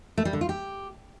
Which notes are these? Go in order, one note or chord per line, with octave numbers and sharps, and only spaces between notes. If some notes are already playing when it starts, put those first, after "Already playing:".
A3
G3
D3
F4
G4